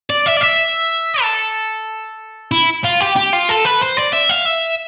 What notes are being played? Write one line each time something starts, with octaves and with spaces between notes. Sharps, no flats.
D5
E5
D5
E5
A4
E4
F4
G4
G4
F4
A4
B4
C5
D5
E5
F5
E5